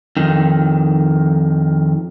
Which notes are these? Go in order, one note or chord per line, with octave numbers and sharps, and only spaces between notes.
F2 D#3